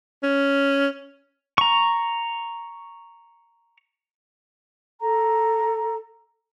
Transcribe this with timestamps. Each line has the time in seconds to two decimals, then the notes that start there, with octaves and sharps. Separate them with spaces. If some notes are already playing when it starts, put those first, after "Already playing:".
0.23 C#4
1.58 A#5 C#6
5.01 A4 A#5